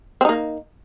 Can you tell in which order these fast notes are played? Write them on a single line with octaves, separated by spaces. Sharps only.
C4 D#4 A#3